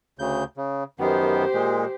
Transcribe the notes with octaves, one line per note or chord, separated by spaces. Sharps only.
D2 C#3 G6
C#3
F#2 D#3 B3 G4 C5
A#2 G#3